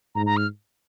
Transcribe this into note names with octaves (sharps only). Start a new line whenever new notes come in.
G#2 A#5
A#5
F6